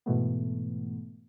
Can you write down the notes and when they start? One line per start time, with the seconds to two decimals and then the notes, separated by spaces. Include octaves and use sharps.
0.06 G#2 B2 E3 A3 B3